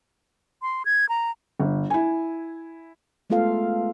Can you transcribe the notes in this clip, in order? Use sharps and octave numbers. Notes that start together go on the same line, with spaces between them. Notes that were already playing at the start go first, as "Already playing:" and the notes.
C6
G#6
A#5
G1
E4 G#5
G#3 A3 B3 F4 A4 F5